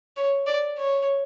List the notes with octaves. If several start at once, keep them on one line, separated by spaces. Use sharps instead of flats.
C#5
D5
C#5